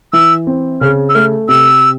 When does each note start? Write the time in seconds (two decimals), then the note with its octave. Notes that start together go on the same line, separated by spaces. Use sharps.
0.13 E3 E6
0.47 C4
0.81 C#3 F6
1.09 E6
1.15 A3 F6
1.48 C3 E6